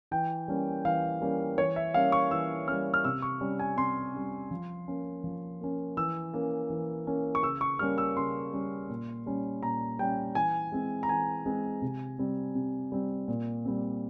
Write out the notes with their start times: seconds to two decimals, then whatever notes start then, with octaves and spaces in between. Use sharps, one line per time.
0.11 E3 G5
0.48 G3 A#3 C#4
0.85 E3 F5
1.21 G3 A#3 C#4
1.58 E3 C#5
1.76 E5
1.94 G3 A#3 C#4 F5
2.12 C#6
2.31 E3 E6
2.68 G3 A#3 C#4 F6
2.94 F6
3.04 C3 E6
3.22 C#6
3.41 G3 C#4
3.59 G#5
3.77 C3 C6
4.14 G3 C#4
4.51 F3
4.88 A#3 C#4
5.24 F3
5.61 A#3 C#4
5.97 E3 E6
6.34 A#3 C#4
6.70 E3
7.07 A#3 C#4
7.35 C#6
7.43 C#3 E6
7.61 C#6
7.79 G3 A#3 C#4 F6
7.98 E6
8.16 C#3 C6
8.53 G3 A#3 C#4
8.90 A#2
9.26 G3 C#4
9.63 A#2 A#5
9.99 G3 C#4 G5
10.35 E3 G#5
10.72 G#3 C4
11.03 A#5
11.09 E3 G#5
11.46 G#3 C4
11.82 C3
12.19 G3 C4
12.55 C3
12.92 G3 C4
13.28 A#2
13.65 G3 C4